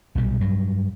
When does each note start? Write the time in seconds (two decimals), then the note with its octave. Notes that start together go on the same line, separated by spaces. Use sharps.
0.15 B1 A#2 G3
0.41 G2 F#3